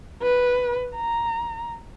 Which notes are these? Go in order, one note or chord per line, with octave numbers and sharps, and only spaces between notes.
B4
A#5